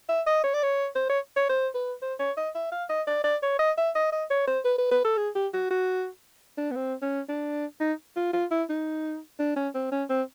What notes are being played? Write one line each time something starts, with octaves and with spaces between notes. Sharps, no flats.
E5
D#5
C#5
D5
C#5
C5
C#5
C#5
C5
B4
C5
C#5
D#5
E5
F5
D#5
D5
D5
C#5
D#5
E5
D#5
D#5
C#5
C5
B4
B4
B4
A4
G#4
G4
F#4
F#4
D4
B3
C4
C#4
D4
D#4
F4
F4
E4
D#4
D4
C#4
C4
C#4
C4